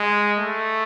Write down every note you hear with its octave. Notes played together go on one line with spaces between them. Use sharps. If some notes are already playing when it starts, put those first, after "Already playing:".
Already playing: G#3
A3